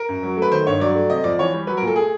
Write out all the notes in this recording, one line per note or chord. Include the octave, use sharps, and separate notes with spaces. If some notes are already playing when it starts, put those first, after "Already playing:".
Already playing: A#4
F#2
F#3
A3
B4
D#3 C5
G2 C#5
F#3 D5
A3
C3 D#5
F2 D5
E3 C#5
G3
F#3 B4
A#4
A#2
A4
A3 G#4